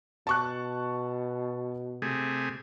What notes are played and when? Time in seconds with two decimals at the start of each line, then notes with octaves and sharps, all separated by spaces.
0.27 B2 A5 C#6 F#6
2.02 C3 A3 G#4